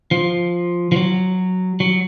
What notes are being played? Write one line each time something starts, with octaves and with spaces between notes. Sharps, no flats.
F3
F3
F#3
F#3